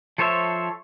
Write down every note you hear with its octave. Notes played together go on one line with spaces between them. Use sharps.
F3 A4 C5 C#5 E5